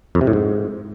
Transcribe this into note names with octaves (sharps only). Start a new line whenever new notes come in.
F2
C3
A2
G#2